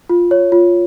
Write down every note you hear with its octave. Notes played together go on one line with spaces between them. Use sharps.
F4
C#5
F4